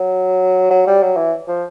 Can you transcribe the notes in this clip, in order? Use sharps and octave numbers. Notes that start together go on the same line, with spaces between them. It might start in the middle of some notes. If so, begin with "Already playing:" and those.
Already playing: F#3
F#3
G3
F#3
E3
F3